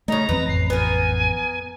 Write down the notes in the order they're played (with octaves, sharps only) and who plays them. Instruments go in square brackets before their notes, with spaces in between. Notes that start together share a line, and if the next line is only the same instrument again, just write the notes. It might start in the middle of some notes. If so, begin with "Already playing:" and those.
[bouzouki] C#3 D#4 [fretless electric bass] A3 [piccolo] A#5
[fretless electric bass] E2 F3 C4 [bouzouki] B4
[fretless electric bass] A1 F2 [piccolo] C7
[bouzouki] B3 A#4 [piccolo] G#5